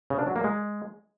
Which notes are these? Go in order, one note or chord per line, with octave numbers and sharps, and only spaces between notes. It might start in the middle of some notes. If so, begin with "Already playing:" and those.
C#3
D4
F#3
A#3
G#3